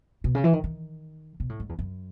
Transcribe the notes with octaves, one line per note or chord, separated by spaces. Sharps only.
B2
C#3
E3
D#3
D#3
B2
A2
G#2
E2
F#2